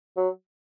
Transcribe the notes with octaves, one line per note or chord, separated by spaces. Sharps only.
F#3